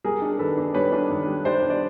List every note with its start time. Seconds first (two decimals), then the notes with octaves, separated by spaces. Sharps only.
0.04 G3 G#4 A#4
0.22 D4
0.39 D#3 A4 B4
0.57 D4
0.74 G3 B4 C#5
0.92 D4
1.10 D#3
1.27 G3
1.45 G3 C5 D5
1.62 D4
1.70 D5